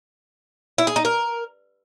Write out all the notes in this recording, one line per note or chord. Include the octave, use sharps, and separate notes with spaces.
E4
G#4
D#4
A#4